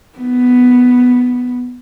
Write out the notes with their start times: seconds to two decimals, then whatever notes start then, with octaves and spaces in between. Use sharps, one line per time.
0.18 B3